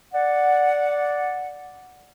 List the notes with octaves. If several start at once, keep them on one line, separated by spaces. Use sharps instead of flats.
D5 F#5